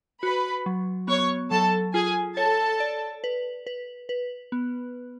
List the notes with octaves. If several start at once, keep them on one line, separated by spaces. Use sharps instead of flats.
F#4 B4 B5
F#3
B3 C#5 C#6
F#3 A4 A5
F4 G#4 G#5
A4 C#5 A5
D5
B4
B4
B4
B3